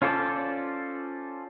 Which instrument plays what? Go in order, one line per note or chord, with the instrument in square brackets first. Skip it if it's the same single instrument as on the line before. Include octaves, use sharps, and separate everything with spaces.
[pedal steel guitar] C#4 F4 A4 C5 D5